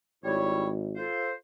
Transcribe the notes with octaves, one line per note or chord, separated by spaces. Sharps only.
G#1 G3 E4 C#5
F4 A4 C5